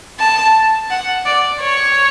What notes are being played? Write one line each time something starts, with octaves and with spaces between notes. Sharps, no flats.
A5
F#5
D5
C#5